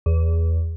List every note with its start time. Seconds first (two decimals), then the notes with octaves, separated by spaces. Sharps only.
0.06 E2